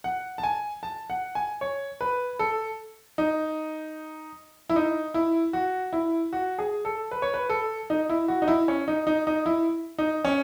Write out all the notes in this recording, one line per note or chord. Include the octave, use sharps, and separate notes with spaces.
F#5
A5
G#5
A5
F#5
G#5
C#5
B4
A4
D#4
E4
D#4
E4
F#4
E4
F#4
G#4
A4
B4
C#5
B4
A4
D#4
E4
F#4
D#4
E4
C#4
D#4
D#4
D#4
E4
D#4
C#4